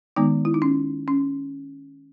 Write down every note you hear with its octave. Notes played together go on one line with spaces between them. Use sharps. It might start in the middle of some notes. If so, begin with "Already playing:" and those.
D#3 G#3 B3 D#4
E4
D#4
C#4
C#4